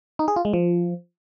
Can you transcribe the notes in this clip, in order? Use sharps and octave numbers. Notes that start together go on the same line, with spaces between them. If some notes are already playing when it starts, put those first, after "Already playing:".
D#4
G#4
F4
G#3
F3